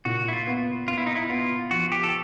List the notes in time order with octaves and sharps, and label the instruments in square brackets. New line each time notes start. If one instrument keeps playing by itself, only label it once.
[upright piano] A#2 [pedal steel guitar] F#4
[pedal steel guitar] E4
F4
[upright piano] B3
[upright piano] B3 [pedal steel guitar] F4
[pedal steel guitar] E4
D#4
E4
[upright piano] B3 [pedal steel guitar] F4
[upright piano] F3 [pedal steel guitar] F#4
[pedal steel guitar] G4
A4